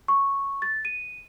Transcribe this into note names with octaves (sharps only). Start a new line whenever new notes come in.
C#6
A6
D#7